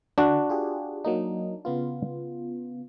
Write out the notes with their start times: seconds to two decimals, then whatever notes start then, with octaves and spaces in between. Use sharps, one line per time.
0.18 D3 D4 F#4
0.50 F4 G4 G#4
1.04 F#3 A#3 D#4
1.65 C#3 B3 F4